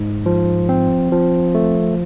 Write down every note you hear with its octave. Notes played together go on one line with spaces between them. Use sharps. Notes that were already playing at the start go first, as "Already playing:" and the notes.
Already playing: G#2
F3
C4
F3
A3